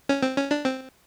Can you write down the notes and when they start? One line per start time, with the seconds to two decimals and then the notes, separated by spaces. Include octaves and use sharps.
0.09 C#4
0.23 C4
0.37 C#4
0.51 D4
0.65 C4